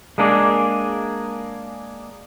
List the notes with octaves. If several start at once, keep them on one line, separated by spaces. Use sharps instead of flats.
G#3 A#3 D4 G#4